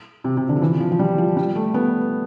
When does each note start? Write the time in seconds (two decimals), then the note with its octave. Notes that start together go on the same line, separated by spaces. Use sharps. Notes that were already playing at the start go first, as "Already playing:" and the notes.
0.24 C3
0.37 C3
0.49 D3
0.57 F3
0.62 E3
0.80 F3
0.92 F3
0.99 G3
1.18 F3
1.37 G3
1.55 A3
1.74 B3